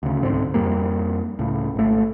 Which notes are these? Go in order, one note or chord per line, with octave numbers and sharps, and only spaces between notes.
D2 C#3
C2 G#2 D3 C4
F2 G3 A#3
C#2 A2
G#1 A3